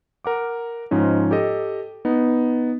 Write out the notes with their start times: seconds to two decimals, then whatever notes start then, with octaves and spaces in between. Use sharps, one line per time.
0.25 A#4 F#5 D6
0.91 G#2 F3 C#4 D#4
1.31 G4 A4 D#5
2.05 B3 D#4